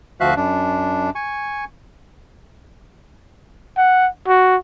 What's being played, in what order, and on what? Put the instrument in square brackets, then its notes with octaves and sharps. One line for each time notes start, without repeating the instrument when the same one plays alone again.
[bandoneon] D2 F3 F#4 E5 F5 F#6
F#2 D4
G#5 C#6
[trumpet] F#5
F#4